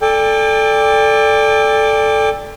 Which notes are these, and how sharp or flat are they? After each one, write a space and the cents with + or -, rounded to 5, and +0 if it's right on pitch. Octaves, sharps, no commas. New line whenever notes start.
A4 +0 D5 +0 G5 +35